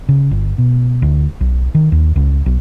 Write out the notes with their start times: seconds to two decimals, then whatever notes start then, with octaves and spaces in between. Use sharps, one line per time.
0.09 C#3
0.31 G1
0.58 B2
1.02 D2
1.41 B1
1.75 D#3
1.92 D#2
2.16 C#2
2.46 B1